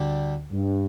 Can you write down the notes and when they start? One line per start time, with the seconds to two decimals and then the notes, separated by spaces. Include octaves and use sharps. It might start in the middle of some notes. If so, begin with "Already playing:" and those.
Already playing: D2 D3 G3 D4 G4
0.52 G2